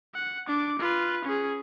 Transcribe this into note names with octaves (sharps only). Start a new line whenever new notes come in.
F#5
D4 D6
F4 B4
C#4 G#4